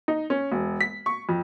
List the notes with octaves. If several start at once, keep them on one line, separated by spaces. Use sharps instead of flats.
D#4
C#4
E1
B6
C#6
F2